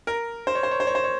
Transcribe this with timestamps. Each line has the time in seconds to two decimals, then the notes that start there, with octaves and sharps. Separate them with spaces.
0.07 A#4
0.47 C5
0.55 C#5
0.63 C5
0.71 C#5
0.80 C5
0.87 C#5
0.95 C5
1.04 C#5